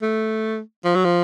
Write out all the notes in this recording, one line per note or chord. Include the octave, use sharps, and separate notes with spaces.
A3
F3
F#3
F3